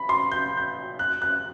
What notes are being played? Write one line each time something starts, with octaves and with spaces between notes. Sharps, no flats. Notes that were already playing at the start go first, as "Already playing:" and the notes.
Already playing: B5
C6
G6
G6
F#6
F#6